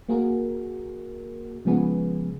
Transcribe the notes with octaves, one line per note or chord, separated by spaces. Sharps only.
A#3 F#4 G#4 A#4
C#3 F3 G#3 B3 G#4 B4